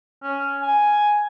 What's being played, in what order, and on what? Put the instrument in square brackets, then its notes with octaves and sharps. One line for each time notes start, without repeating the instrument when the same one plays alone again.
[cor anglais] C#4
G#5